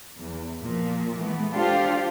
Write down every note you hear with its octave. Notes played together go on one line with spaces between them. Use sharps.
E2
A#2 F3
E3 G#3 A3 B3
D4 F4 G4 A4 C5 F5